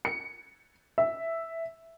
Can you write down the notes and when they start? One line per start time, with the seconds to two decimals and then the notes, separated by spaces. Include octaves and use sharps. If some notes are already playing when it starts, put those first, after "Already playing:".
0.05 C#7
0.98 E5